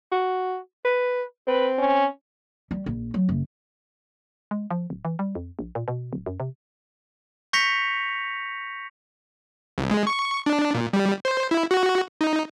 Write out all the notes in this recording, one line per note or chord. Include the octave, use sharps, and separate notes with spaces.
F#4
B4
C4 B4
C#4
G3
A#1
F#3
F#1
G#3
F3
D1
E3
G3
F2
A#1
A#2
B2
D1
F#2
C3
C#6 G6 A#6 B6 C#7 F7
C2
G#3
C#6
D4
A#2
G3
C5
E4
F#4
D#4